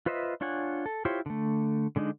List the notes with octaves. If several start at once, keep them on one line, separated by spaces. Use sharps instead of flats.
F4 B4 C5 D#5 E5
D4 F4 C#5 F#5 G#5
A4
E4 F4 G4 C5 C#5
D3 A3
D3 G#3 D4 D#4